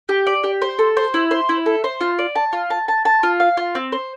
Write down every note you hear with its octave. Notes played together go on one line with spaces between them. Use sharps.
G4
D5
G4
C5
A4
C5
E4
C5
E4
A4
C5
F4
D5
A5
F4
A5
A5
A5
F4
F5
F4
C4
C5